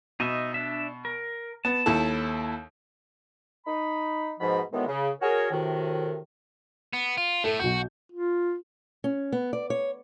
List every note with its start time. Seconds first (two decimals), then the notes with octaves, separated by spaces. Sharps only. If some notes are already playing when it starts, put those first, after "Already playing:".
0.20 B2 D#4 D#5 E5
0.54 D4 E5
1.05 A#4
1.65 B3 A5
1.86 D#2 E4 A4
3.66 D#4 B5
4.40 G#2 B2 F3 B5
4.72 A2 D#3 E3 F#3 G#3 B3
4.88 C#3
5.21 F#4 G#4 A#4 C#5
5.51 A2 C3 D#3 F#4
6.93 B3
7.18 F4
7.44 A2 A3 A4
7.59 B1 F#4 G6
8.12 F4
9.04 C#4
9.32 B3
9.53 D5
9.70 C#5